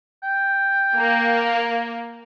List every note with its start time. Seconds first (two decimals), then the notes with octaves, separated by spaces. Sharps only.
0.24 G5
0.97 A#3